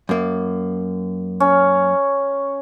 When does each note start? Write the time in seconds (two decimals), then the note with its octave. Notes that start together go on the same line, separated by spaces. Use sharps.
0.09 F#2 A#3
1.40 C#4